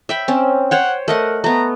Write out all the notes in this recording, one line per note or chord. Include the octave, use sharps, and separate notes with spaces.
E5 G5 B5
C4 C#4
C5 C#5 F#5 G5
A3 A#4 D#5 F#5
A3 B3 A#5